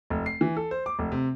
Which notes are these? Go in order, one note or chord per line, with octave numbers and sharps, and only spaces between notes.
F1
C7
E3
A4
C5
D6
F1
C3